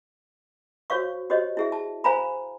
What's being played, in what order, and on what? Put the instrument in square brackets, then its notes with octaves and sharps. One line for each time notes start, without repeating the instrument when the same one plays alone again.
[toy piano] F#4 C5 C#5 F5 C#6
F#4 G4 C5 C#5 D#5
E4 G#4 E5
A5
C5 F5 G#5 A#5 B5